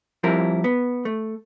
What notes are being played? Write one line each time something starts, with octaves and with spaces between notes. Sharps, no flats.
F3 G3 C4 E4 A#4
B3
A3